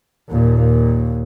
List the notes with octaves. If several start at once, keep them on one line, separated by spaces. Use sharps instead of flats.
D#2 A#2